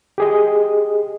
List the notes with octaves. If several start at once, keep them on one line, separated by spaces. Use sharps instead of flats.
G4 G#4 D#5